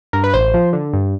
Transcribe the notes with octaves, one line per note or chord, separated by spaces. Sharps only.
G2 A#4
B4
A1 C5
F3
D3
G2